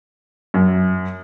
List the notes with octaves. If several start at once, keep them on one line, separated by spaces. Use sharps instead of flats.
F#2